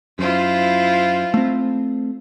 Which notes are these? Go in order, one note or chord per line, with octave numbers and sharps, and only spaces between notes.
F#2 E4 F4 C5
A3 C4